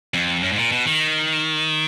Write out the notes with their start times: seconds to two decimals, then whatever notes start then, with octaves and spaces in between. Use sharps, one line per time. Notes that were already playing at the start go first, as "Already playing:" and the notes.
0.14 F2
0.43 F#2
0.52 G#2
0.57 A#2
0.72 B2
0.86 D#3